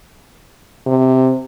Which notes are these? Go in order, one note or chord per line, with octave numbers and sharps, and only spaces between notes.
C3